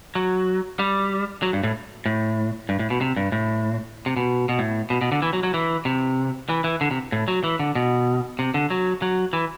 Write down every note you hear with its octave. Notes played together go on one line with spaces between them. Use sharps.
F#3
G3
F#3
G2
A2
A2
G2
A2
B2
C3
G2
A2
C3
B2
B2
A2
B2
B2
D3
E3
F#3
F#3
E3
C3
E3
E3
D3
C3
A2
F#3
E3
D3
B2
C3
D3
F#3
F#3
E3